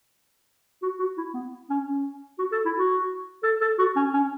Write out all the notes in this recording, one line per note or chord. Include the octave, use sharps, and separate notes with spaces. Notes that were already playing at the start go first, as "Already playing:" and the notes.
F#4
F#4
E4
B3
C#4
C#4
F#4
A4
E4
F#4
A4
A4
F#4
C#4
C#4